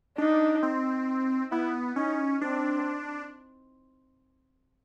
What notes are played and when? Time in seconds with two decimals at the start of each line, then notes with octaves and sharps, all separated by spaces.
0.18 D4 D#4
0.63 C4
1.52 B3 E4
1.96 C#4 D#4
2.41 C4 D4